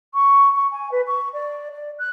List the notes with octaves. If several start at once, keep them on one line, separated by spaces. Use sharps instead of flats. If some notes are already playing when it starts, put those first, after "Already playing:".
C#6
C#6
G#5
B4
C#6
D5
D5
F#6